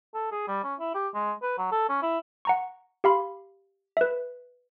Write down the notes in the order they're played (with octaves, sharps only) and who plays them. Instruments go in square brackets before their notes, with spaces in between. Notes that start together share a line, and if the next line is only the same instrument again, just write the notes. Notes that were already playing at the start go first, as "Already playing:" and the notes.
[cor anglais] A4
G#4
G3
C#4
E4
G4
G#3
B4
F#3
A4
C#4
E4
[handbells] F#5 A#5 C#6
G4 F5 B5 C6
B4 E5